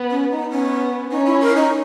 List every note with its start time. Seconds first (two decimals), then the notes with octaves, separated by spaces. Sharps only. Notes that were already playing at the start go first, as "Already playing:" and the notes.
Already playing: B3
0.10 C#4
0.31 D#4
0.50 B3 C#4
1.11 C#4 D#4
1.26 E4
1.41 A#4
1.56 D#4